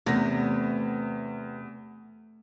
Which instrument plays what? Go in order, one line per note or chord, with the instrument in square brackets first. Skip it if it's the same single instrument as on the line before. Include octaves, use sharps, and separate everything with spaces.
[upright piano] E2 A#6 [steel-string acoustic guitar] C3 B3 [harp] A3